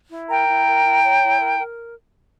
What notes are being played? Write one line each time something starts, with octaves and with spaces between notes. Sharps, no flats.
E4
A#4 G5 A#5
E4
A#4
E4
C#5
E4
A#4
A#4